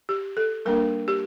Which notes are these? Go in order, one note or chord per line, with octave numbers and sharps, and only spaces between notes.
G4
A4
G3 A#3 D4 A#4
G4